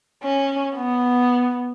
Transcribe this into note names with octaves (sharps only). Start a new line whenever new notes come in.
C#4
B3